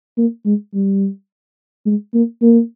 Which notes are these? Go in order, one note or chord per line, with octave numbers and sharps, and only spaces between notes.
A#3
G#3
G3
G#3
A#3
A#3